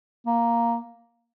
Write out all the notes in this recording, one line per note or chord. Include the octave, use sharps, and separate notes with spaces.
A#3